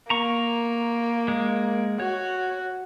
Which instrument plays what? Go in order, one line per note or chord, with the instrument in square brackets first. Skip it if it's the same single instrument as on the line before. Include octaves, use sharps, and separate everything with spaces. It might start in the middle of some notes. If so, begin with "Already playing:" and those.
[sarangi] A#3 [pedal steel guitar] A#5 C#6
[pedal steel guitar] G#3
[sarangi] F#4 [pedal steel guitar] C#5